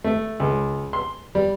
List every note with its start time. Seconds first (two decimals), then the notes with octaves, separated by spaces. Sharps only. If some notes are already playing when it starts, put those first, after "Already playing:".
0.04 A3
0.40 C#2
0.93 C6
1.35 G3